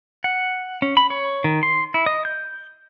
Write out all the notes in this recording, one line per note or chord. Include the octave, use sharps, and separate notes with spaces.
F#5
C#4
B5
C#5
D#3
C6
E4
D#5
G6